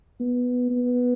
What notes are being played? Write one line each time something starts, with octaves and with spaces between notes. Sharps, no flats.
B3
B3